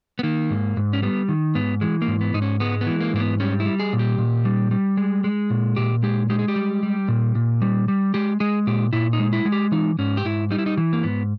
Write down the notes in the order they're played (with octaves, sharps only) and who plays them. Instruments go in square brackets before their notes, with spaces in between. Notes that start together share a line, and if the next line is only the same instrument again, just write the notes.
[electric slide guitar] B3
D#3 A#3
G#2
G#2
C#4
G3 B3
D#3
G#2 B3
E3 G#3
A#3
G#2
B3
G#2 D#4
C#4
G#3 B3
B3
E3
A#3
G#2 A#3
B3
G3 C#4
E4
G3
G#4
A#2
G4
A#2
G3
G3
G#3
G#3
A#2
A#2 G4
G#3 G4
G#3 G4
G#4
G4
G3
G3
A#2
A#2
G3
G3
G#3 G4
G#3 G#4
A#2 G4
A#2 E4
D#4
G#3
E4
G#3
G4
E3 D#4
G#2 C#4
G4
G#2 E4
G3 D#4
E4
D#4
E3
A#3
G#2 B3